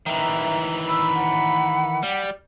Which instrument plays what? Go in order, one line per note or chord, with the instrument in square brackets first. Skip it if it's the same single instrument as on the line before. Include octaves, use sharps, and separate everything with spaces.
[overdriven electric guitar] D#3 E3 [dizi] E5 [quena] A#5
[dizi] B5 [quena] E6
[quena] F#5
[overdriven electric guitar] G3